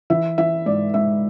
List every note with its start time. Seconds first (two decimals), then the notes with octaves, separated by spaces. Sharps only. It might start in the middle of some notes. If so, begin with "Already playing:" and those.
0.10 E3 E5
0.38 E3 E5
0.66 G#2 D5
0.94 G#2 E5